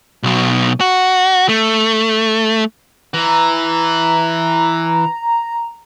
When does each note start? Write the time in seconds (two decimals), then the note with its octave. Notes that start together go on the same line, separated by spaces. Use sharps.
0.23 B1 B2
0.80 F#4
1.49 A3
3.14 E3 A#5